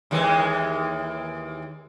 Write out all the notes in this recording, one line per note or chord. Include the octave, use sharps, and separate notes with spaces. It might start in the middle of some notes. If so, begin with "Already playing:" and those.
D#2 E3 G#3